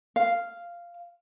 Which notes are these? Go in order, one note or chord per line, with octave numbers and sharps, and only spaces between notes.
F5